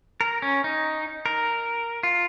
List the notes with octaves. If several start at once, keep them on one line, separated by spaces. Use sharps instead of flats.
A#4
C#4
D#4
A#4
F4